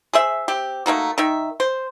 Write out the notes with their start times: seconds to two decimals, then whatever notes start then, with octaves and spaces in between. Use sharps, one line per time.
0.13 G#4 C5 E5
0.48 C4 G4
0.86 A3 A#3 D#4 F#4
1.18 D#3 D#4 E5
1.60 C5